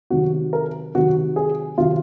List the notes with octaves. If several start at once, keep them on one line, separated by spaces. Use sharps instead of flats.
C3 D#3 F#3 F#4
A#4
C3 D#3 F#3 F#4
G#4
C3 D#3 F#3 F4